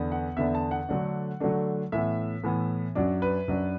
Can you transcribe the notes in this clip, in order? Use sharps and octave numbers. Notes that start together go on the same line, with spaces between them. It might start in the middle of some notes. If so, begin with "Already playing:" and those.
Already playing: E2 D3 B3 D4
F#5
E2 D3 B3 D4 E5
A5
F#5
D3 F#3 A3 D4
D3 F#3 A3 D4
A2 E3 B3 E5
A2 E3 B3
F#2 F#3 D4 D5
B4
F#2 F#3 D4